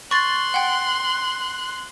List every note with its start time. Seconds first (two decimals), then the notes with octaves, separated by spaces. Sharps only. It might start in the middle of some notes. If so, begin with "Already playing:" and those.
0.11 C6 C#6 F#6 A6
0.54 F#5 G5